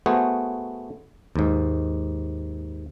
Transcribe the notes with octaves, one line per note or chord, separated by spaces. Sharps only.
A3 B3 F#4 G#4 C5
D#2 G#2